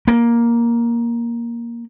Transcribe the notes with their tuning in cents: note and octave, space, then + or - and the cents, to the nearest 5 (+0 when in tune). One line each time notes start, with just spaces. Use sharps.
A#3 +10